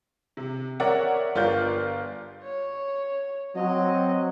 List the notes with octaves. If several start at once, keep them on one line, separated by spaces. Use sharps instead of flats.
C3
A#4 C#5 D5 E5 F#5
G1 F4 A#4 D5 F5 G6
C#5
F#3 C4 D#5